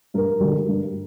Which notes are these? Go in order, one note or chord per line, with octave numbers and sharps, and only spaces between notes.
G2 A#4
D3 G3
G2